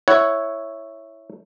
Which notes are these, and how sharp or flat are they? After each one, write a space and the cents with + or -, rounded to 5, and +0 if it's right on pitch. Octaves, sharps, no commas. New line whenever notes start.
E4 +0 C#5 +0 F#5 +0